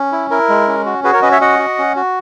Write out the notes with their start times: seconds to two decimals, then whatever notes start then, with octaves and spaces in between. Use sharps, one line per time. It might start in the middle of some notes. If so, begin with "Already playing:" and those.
Already playing: C#4
0.12 E4
0.30 E4 A#4
0.49 G#3
0.68 C#4
0.86 F#4
1.04 F#4 G#4 B4
1.13 A#4 C#5
1.22 C#4 B4 D#5
1.31 C#5 E5
1.41 F#4 D#5 F#5
1.59 F#4
1.78 C#4
1.96 F#4